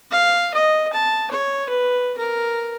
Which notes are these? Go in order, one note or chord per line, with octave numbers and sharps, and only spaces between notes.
F5
D#5
A5
C#5
B4
A#4